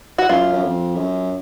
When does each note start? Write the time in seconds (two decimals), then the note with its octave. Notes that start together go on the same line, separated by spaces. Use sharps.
0.18 F#4
0.29 F#2 F4
0.53 F#2
0.63 F2
0.96 F#2